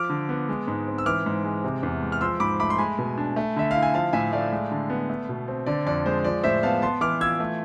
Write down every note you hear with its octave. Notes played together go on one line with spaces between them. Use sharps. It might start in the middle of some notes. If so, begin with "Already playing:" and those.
Already playing: F3 D6 F6
D3
B3
G#3
G#2
C4
E6
E3 D6 F6
G#2
G#3
C3
E2
G#3
F6
F3 C6 E6
G#2 B5 D6
A3 B5 D6
C6
G#3 G#5 B5
B2
D4
A3
D3 E5
E4 F5
G#5
F3 F5 A5
A2 E5 G#5
A3 D5 F5
G#3
D3
B3
A3
B2
C4
D3 D5
F2 D5
G#3 C5
F3 D5
A2 C5 E5
B3 F5 A5
B3 A5 C6
E3 D6 F6
F4 E6 G#6
A3